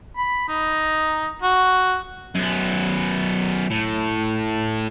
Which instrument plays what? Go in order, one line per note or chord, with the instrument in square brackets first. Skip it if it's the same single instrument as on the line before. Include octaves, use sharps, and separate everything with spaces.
[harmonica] B5
D#4
F#4
[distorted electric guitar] F#2 B3
A2